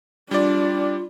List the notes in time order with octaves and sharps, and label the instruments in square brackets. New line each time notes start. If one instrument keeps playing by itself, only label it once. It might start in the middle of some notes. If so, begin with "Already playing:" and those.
[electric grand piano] G3 D5 [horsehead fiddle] D4 [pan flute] F4